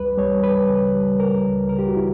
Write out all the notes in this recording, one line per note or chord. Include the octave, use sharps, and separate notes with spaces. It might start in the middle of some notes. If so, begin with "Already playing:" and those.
Already playing: C#2 G3 B4
G3 C#5
G3 B4
C#3
G3
C#3 A#4
C#2
C#3 A#4
G4
F#4
E4